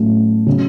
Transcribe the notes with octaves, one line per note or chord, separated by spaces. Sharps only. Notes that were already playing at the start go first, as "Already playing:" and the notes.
Already playing: A2 F#3 A3 C#4
C#3 F#3